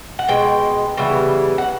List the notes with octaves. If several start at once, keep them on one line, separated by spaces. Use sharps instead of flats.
F#5
B2 G#3 G5
C#3 E3 G3 B3
F#5